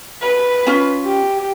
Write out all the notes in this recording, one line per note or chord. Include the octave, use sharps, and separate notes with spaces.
B4
C#4 F4
G4